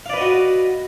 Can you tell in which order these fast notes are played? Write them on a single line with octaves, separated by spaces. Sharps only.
F5 D5 B4 D#5 F#4